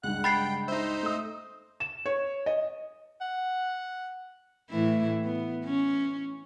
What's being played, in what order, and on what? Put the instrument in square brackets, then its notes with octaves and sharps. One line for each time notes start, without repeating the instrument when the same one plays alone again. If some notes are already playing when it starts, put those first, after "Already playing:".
[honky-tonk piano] C#2 G2 [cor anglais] F#5 [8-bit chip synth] F#6
[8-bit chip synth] G5 [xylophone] B5 A6 C7
[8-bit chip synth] D#4 C5 [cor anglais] E5
[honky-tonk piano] A3 D#6
[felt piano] E7
C#5
D#5
[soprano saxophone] F#5
[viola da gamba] A2 E3 E4
B3
C#4